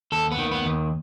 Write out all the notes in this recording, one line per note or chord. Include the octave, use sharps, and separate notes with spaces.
D#2 A4
B3
D#3
B3
D#2